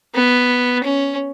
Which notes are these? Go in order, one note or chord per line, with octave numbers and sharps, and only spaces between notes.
B3
C#4